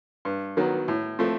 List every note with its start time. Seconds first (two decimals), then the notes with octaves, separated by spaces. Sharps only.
0.25 G2
0.57 D#3 F#3 B3
0.88 A2
1.19 F3 A3 C4